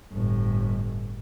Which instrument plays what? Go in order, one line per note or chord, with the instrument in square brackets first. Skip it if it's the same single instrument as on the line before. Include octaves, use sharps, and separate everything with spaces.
[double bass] G1 A2